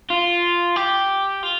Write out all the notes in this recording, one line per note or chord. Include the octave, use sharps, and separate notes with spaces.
F4
G4
F4